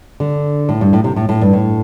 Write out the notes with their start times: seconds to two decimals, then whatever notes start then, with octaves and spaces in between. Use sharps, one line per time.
0.20 D3
0.69 A2
0.81 G2
0.93 A2
1.04 C3
1.16 A2
1.29 A2
1.41 G2
1.53 A2